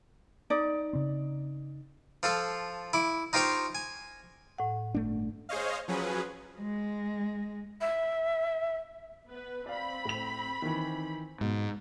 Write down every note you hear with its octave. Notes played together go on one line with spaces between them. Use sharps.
D#4 D5
C#3 C4
F3 F4 A4
E4 D6
D#4 F4 G4 C5 F5 C#6
G#5
A2 F#5
G1 A3 D4
G#4 C5 C#5 D#5 F5
F3 F#3 C#4 G#4 B4
G#3
E5
B3 B4
C4 D5 F5 B5
A2 F7
D#3 E3
G#2 B2